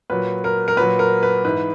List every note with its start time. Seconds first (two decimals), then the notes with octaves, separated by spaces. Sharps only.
0.10 A#2 F#3 B4
0.44 A#4
0.68 A#4
0.77 A#2 F#3 B4
0.99 A#4
1.23 B4
1.45 G#2 E3 B4